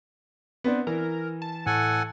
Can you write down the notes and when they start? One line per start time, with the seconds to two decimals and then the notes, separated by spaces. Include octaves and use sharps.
0.64 B3 C4 D4
0.87 E3 A#4
1.42 A5
1.66 A2 A4 F#5 G#5